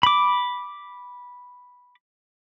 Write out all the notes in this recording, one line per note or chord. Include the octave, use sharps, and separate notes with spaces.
B5 D6